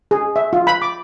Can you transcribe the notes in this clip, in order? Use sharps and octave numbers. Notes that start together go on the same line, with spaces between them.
G#4
E5
F4
B5
D6